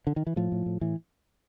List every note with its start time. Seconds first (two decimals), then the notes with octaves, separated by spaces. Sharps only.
0.07 D3
0.16 D#3
0.27 E3
0.36 A2 F3
0.52 A2
0.66 A2
0.81 A2 E3